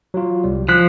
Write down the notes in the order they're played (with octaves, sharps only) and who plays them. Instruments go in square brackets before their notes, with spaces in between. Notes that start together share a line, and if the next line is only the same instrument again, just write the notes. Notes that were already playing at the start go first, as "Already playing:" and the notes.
[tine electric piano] F#3 F4
C2 G3
[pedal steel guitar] F3 F#6 [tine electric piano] B6